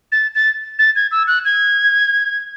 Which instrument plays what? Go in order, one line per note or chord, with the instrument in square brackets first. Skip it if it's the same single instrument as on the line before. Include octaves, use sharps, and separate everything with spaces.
[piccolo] A6
A6
A6
G#6
E6
F#6
G#6